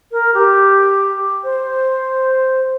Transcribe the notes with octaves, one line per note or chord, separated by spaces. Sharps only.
A#4
G4
C5